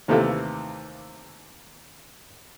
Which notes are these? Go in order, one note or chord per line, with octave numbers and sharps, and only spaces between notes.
D#2 C3 E3 A3 A#3